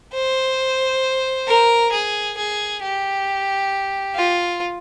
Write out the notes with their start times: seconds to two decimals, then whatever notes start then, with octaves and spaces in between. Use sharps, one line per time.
0.14 C5
1.47 A#4
1.92 G#4
2.37 G#4
2.82 G4
4.15 F4